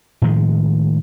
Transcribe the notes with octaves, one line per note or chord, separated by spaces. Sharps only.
A2 D#3 F3 G#3